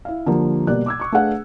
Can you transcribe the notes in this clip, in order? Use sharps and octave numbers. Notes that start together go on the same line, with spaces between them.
E4 F5
D3 F3 G3 A#3
B2 G3 A#3 D5 F#6
D6 E6 G#6
C#6 D6
A3 D4 G#4 B4 F5 F#5